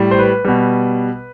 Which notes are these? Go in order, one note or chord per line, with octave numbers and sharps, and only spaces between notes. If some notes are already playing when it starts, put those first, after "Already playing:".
Already playing: A2 G3
C5
B4
B2 G3